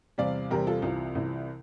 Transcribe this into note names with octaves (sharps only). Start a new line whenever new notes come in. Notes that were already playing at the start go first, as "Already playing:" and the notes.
E2 C3 G3 C4 D5 F5
E2 C3 G3 C4 G4 A#4
F4 A4
C2 C3 E3 F4
C2 C3 E3